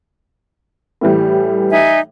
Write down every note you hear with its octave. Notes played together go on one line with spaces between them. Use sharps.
A2 E3 G3
D#4 E5 G#5